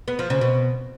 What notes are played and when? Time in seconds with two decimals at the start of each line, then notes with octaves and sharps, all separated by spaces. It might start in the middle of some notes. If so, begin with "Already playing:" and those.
0.08 B3
0.19 F3
0.30 C#3
0.41 B2